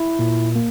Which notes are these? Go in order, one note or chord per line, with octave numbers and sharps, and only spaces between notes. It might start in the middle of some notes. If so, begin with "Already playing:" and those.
Already playing: E4
A#2
A#3